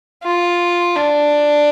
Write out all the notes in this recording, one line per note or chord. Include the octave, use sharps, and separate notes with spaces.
F4
D4